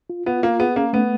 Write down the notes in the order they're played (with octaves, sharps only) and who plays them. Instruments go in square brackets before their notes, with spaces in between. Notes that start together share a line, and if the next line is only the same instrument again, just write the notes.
[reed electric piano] F4
[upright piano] B3 [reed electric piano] F4
[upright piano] A#3 [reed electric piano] F4
[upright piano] B3 [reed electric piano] G#4
[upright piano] A#3 [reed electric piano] C#4
[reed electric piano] A3 [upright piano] B3